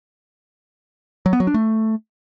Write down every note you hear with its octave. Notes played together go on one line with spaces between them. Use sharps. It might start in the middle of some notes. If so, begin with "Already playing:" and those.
F#3
B3
F#3
D4
A3